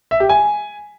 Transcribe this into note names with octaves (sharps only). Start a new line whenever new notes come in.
E5
G4
G#5